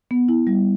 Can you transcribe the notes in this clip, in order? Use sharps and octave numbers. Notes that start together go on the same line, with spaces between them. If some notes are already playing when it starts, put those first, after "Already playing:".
B3
E4
G3